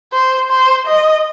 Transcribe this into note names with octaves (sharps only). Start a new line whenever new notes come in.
C5
C5
D#5